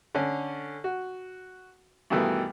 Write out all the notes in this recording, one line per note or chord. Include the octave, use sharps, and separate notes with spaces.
D3 C#4
F#4
G2 B2 D#3 E3 A3